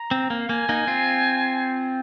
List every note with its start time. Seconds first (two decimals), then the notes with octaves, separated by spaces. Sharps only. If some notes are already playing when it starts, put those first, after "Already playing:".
Already playing: A#5
0.11 C4
0.30 A#3
0.38 F5
0.49 A#3 G#5
0.69 A#3 D#4
0.87 C4 F4